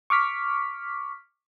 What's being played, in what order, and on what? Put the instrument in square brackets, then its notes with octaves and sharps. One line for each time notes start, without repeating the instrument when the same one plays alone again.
[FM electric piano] C#6 D6 F6 B6